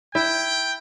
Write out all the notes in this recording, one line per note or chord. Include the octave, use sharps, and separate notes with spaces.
E4 G5